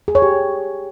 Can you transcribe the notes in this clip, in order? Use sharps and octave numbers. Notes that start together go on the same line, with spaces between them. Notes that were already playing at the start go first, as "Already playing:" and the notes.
G#4
C#5
G4